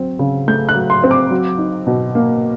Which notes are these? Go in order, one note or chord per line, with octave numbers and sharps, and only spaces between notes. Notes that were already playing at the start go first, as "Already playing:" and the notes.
Already playing: F#3 C4
C#3
A3 G6
F#6
F#3
C6
C4
D6
F#3
D#4
B2
A#3